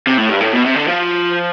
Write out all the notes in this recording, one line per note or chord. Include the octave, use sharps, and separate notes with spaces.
C3
A2
G2
A2
B2
C3
D3
F3